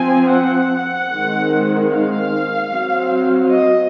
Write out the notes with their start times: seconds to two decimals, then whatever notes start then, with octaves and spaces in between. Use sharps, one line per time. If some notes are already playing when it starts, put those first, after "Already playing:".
Already playing: F3 C4 G#5
0.33 F#5
1.13 D#3 G#3 C4
1.92 F5
2.72 F#3 C4
3.51 D#5